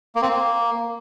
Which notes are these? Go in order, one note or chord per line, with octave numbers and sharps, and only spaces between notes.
A#3
C4
A#3